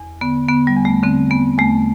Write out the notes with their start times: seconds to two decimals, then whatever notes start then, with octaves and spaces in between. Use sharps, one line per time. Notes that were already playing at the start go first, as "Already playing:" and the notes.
Already playing: E2
0.21 D3 B3
0.48 D3 B3
0.67 G3
0.76 E2
0.85 A3
1.03 D3 C4
1.30 E2 B3
1.58 E2 A3